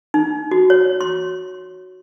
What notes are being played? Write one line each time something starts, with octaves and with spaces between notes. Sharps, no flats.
D#4
F#4
C#5
C6